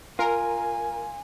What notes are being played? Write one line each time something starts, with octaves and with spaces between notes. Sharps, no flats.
F4 A#4 G#5